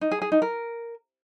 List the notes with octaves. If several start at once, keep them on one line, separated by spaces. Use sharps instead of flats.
D#4
G#4
G#4
D#4
A#4